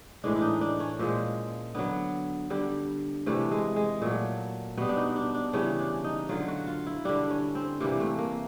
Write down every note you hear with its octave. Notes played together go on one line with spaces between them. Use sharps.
A2 E3 G#3 D4
D4
D#4
D4
C#4
A#2 F3 G#3
D3 F#3 B3
D3 G3
C3 E3 G3 A3
G#3
G#3
A#2 F#3 A3
B2 G3 B3
D4
D#4
D4
D4
C#3 E3 G3 C#4
D4
D#4
D3 F#3 F4
F#4
F4
E4
D3 G3 D4
C#4
C4
C3 E3 G3 A#3
A3
A#3